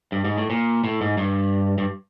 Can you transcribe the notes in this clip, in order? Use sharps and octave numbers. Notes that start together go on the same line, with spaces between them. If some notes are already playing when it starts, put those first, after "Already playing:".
G2
G#2
A2
A#2
A2
G#2
G2
G2